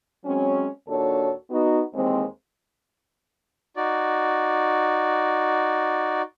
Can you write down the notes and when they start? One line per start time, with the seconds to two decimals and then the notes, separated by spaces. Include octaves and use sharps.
0.25 F#3 G#3 C4 C#4
0.88 D#2 A#2 D4 F#4 A4 C#5
1.50 B3 D#4 F#4
1.94 D#2 E3 G#3 C4
3.76 D#4 F#4 D5